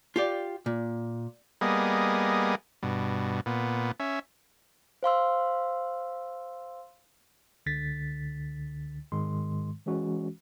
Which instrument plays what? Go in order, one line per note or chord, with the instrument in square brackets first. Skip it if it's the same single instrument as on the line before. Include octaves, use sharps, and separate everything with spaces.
[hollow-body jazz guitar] F4 G4 D5
A#2
[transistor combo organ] G3 A#3 B3 G#4 D#5
G2 B2
A#2 B3
C#4 E5
[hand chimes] C5 F5 C6 E6
[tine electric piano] C#2 D3 A6 B6
G#2 D#3 G#3 C6
E3 G#3 C#4 F#4